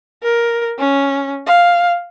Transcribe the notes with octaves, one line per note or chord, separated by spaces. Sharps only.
A#4
C#4
F5